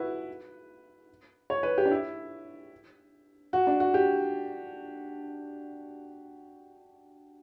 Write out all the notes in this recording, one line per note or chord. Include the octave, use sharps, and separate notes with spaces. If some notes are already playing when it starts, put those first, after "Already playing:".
Already playing: E4 F#4 B4
C#5
B4
G4
D4
E4
F#4
D4
F#4
G4